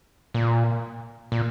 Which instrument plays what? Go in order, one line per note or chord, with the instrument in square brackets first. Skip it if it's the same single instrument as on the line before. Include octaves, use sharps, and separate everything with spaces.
[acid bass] A#2
A#2